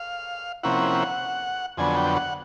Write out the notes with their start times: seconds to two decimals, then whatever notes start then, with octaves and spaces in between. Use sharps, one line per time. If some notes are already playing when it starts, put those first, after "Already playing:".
Already playing: F5
0.63 C3 F3 A#3 C#4 E4 F#5
1.77 F2 D3 F#3 B3 G#5
1.96 G5
2.16 F#5